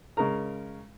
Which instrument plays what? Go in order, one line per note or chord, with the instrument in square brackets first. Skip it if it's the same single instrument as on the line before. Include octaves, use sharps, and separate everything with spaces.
[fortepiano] C#3 G#3 A#4 A#5